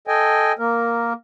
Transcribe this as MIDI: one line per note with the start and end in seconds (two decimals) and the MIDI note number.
0.07 0.52 69
0.07 0.52 75
0.07 0.52 79
0.07 0.52 80
0.59 1.13 58
0.59 1.13 70